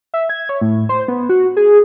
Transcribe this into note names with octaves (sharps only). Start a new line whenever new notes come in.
E5
G#6
C#5
A2
C5
B3
F#4
G#4